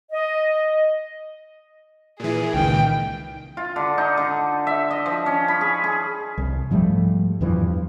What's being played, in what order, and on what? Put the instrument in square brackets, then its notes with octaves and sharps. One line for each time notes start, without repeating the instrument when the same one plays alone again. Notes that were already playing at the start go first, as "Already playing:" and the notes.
[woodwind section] D#5
[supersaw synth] A#2 E3 [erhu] G#4
[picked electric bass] C#2 D#3 [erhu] G5
[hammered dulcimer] F4
D3
D#4
D3
E5
D#5
F3
C#4
B5
G#4
G#4
[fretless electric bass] C2
G#2 F3 G3 A3
E2 G2 E3 F3